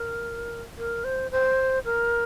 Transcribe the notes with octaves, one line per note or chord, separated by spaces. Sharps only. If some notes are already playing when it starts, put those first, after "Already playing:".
Already playing: A#4
A#4
C5
C5
A#4